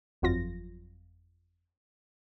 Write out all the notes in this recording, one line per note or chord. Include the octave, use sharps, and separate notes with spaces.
G1 F2 F#3 F4 A#6